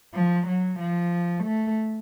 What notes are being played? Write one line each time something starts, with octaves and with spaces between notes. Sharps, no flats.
F3
F#3
F3
A3